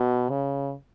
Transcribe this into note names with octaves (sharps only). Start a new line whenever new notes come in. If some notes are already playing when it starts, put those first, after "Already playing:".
Already playing: B2
C#3